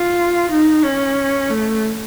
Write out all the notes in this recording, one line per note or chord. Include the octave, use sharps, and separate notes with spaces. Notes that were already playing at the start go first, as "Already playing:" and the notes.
Already playing: F4
D#4
C#4
A3